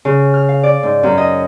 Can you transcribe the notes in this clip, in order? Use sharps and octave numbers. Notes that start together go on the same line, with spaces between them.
C#3
F6
F5
D5
G#2
F#2
D#5